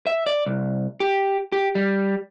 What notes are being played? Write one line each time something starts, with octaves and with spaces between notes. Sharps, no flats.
E5
D5
C2
G4
G4
G3